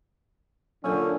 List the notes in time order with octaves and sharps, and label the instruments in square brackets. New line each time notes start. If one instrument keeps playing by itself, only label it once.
[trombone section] A#2 D3 [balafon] F#3 A4 [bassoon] C#4